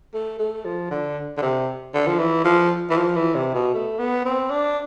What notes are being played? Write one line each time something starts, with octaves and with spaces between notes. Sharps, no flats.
A3
A3
F3
D3
D3
C3
D3
F3
E3
F3
E3
F3
E3
C3
B2
A3
B3
C4
D4